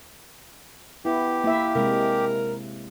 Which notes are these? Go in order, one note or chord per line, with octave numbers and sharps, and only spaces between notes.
B3 E4 G4
A#3 E4 E5
C3 G#3 A#4